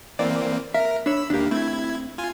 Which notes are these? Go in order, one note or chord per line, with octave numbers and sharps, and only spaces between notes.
E3 A#3 C4 D5
A#4 E5
D4 C#5 B5 E6
D#2 A#3 D4 G4
A3 C4 E4 G#6
F4 G#5